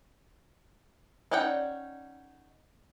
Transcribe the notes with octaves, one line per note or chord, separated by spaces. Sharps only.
C#4 D#4 D5 F#5 G5